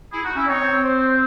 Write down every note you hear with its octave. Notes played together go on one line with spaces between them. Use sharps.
E4 G#4
D#4 F#4
C#4 E4
C4 D#4 C#5
C4
C4
C5